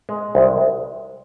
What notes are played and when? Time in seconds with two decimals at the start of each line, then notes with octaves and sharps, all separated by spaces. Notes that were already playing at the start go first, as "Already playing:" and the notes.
0.09 G#3
0.35 C2